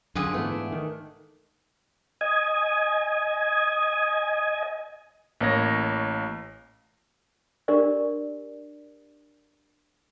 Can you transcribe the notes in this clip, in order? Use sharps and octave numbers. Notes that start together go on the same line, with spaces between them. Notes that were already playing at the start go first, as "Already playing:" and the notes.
F#2 D3 D4 F4 G#4 F#5
G#2 E3 A3 B3 D4
D#3
D#5 G#5
A1 A#3 C#5 A#6
D4 G4 A#4 D5 C6